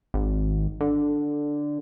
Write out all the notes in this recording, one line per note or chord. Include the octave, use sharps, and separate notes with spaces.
G#1
D3